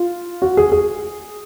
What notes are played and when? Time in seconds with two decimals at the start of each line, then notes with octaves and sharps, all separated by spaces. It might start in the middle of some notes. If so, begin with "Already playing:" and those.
Already playing: F4
0.42 F#4
0.57 G#4
0.72 G#4